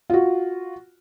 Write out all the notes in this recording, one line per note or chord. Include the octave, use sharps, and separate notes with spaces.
F4 F#4